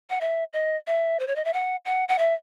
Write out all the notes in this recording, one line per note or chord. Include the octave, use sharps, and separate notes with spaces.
F#5
E5
D#5
E5
C5
C#5
D#5
E5
F#5
F#5
F#5
E5